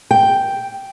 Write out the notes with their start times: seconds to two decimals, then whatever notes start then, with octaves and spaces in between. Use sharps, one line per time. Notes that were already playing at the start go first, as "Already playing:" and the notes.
0.11 G5